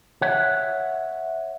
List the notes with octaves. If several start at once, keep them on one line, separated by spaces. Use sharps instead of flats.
C#5 E5 F#5